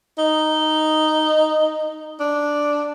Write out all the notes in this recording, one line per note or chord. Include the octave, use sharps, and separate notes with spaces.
D#4
D4